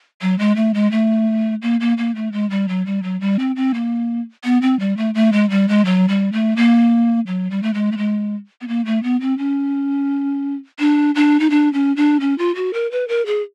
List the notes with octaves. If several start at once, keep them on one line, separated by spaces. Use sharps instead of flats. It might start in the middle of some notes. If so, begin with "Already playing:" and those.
F#3
G#3
A3
G#3
A3
A#3
A#3
A#3
A3
G#3
G3
F#3
G3
F#3
G3
C4
C4
A#3
B3
C4
G3
A3
A3
G#3
G3
G#3
F#3
G3
A3
A#3
F#3
G3
A3
G#3
A3
G#3
B3
A#3
A3
B3
C4
C#4
D4
D4
D#4
D4
C#4
D4
C#4
F4
F#4
A#4
B4
A#4
G#4